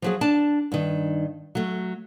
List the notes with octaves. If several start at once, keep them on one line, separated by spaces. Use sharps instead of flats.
F3 F#3 G#4
D4 A5
G2 D#3
F#3 A3